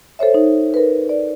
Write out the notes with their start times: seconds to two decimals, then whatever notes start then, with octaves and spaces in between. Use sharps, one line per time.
0.19 A4 C5 C#5 E5
0.34 D#4
0.74 A#4 B4
1.09 D5